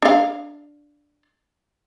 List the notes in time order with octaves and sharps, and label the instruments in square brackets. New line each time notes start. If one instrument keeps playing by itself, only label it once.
[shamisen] D4 F5